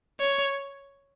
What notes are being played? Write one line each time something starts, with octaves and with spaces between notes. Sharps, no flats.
C#5